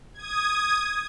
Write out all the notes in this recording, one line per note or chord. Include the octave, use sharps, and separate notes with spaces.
D#6 G#6